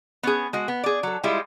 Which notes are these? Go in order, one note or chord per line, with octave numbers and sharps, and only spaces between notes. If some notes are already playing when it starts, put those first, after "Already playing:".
B3 C#4 G#4
G#3 F#4
B3
G#4 D5
F#3 A4
G3 G#3 E4 F4